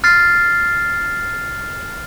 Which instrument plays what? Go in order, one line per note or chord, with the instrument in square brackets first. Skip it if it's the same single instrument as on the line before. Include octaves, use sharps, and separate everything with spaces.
[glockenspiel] F6 A6 C7